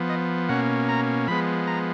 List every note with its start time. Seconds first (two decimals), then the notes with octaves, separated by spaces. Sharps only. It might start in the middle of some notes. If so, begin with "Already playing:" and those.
Already playing: F3 B3
0.09 D#5
0.49 B2 A#3 C#4 F#5
0.89 A#5
1.28 F3 G#3 B3 B5
1.67 A#5